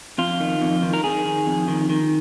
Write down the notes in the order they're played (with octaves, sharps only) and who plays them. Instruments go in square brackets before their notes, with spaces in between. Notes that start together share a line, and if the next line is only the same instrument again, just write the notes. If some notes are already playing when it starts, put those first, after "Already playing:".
[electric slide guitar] F2 F4
D#3
F2
D#3
A#4
D#3 G#4
D#3
F2
D#3
D#3